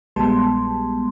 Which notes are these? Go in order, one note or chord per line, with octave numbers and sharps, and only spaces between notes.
A#1 G3 G#3 B3 A5 C6